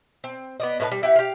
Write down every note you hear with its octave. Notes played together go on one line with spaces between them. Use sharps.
C4
B3 D5 D#5
A2 D#4 B4 A5
G3
E4 G4 F#5
G4 F5